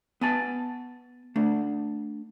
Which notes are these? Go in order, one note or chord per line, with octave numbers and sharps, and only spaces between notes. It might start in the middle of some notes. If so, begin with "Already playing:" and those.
B3 G#5 A5
A3 D4